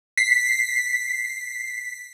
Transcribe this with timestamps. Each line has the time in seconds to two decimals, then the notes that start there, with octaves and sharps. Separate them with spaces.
0.17 B6 C7